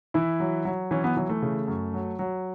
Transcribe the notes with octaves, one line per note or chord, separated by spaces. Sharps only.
E3 E4
F#3
F#3
E3 C#4
B3
E3 F#3
A3
C#3
F#2
F#3
F#3